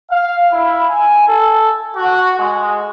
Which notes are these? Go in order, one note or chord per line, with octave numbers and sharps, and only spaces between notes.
F5
E4
G#5
A4
F#4
G#3